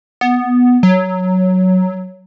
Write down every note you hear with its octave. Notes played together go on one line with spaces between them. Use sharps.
B3
F#3